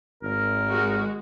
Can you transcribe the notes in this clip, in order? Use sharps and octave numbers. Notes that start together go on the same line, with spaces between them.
G#1 A#4
G#3 F#4